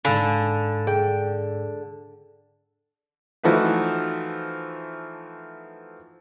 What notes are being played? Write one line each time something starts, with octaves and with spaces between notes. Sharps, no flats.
G#2 D3 F5 G#5 B5 E6 A6
G#4 G5
E3 F3 A3 D#4 F#4 B4